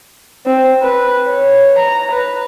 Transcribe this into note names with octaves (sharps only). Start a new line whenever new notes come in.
C4
B4
C#5
A#5
B4